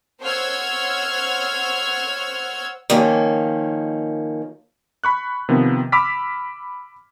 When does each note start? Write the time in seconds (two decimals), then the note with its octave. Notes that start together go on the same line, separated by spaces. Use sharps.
0.22 C5 C#5 F#5 E6 F6 G#6
2.90 D#3 F3 A#3 C#4
5.04 B5 C#6 F#6
5.49 C3 D#3 F3 B3
5.92 B5 D6 E6 F6 B6